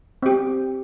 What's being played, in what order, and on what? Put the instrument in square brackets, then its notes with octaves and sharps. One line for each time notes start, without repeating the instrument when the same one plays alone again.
[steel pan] C4 G4